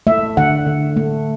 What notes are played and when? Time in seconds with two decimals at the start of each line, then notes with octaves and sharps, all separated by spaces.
0.07 A3 E5
0.37 D3 F#5
0.66 D3
0.97 A3